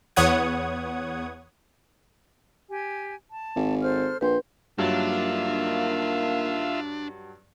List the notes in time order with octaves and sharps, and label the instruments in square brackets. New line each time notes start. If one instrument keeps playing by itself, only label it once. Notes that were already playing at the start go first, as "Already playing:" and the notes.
[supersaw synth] E2 B3 C#5 F#5 D#6 G#6
[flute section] G4 G#5
A5
[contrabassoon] G#1
[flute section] A4 C5 F6
[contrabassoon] A#1 [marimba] B4 [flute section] C6 G6
[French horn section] D2 D#3 A#3 [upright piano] G2 F#3 [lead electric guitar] D4 [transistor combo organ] F4 E5